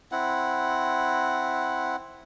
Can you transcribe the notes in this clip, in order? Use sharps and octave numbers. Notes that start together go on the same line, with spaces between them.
C4 E4 F#5